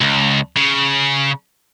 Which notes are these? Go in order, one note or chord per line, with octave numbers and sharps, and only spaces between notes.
C#2
C#3